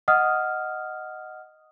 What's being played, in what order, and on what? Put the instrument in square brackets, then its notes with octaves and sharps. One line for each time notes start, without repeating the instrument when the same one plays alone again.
[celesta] D#5 F#5 D#6 F6